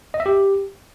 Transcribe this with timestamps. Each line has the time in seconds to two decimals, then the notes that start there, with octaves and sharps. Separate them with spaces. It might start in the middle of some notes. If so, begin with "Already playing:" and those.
0.14 D#5
0.20 E5
0.26 G4